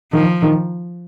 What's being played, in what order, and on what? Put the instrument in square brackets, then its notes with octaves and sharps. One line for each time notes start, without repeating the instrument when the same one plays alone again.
[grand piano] D#3 [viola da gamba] F3
[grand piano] D#3